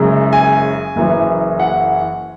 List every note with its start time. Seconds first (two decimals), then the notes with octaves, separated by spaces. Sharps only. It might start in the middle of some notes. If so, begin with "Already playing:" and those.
Already playing: F#1 F#2 C#3 G#3
0.33 G#5
0.96 F#1 F#2 E3
1.60 F#5